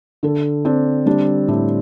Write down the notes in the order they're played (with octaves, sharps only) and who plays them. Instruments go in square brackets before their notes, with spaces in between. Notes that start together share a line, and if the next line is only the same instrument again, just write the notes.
[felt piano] D3 A4
C4 D4
G3 D4
A2 D4